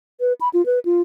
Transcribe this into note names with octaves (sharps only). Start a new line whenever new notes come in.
B4
B5
F4
B4
F4